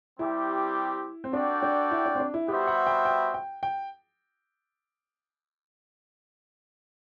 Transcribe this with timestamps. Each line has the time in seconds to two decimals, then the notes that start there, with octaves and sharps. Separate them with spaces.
0.19 G3 C4 E4 G4
1.24 C4
1.33 D4 F#4 A4 D5 G5
1.62 D4
1.91 E4
2.05 D4
2.15 C4
2.20 D4
2.34 E4
2.48 G3 B3 F#4 G4 C5 E5
2.67 F#5
2.87 G5
3.05 G5
3.34 G5
3.63 G5